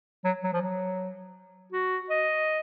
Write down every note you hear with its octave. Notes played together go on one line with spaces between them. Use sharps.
F#3
F#3
F3
F#3
F#4
D#5